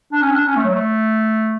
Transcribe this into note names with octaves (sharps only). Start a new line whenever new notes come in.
D4
C#4
D4
C#4
A3
F#3
A3